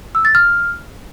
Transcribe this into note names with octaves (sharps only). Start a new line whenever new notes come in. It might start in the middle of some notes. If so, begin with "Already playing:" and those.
E6
A6
F6